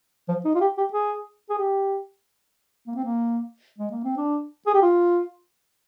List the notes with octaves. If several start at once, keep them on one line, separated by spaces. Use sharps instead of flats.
F3
D#4
F4
G4
G4
G#4
G#4
G4
A#3
C4
A#3
G#3
A#3
C4
D4
G#4
G4
F4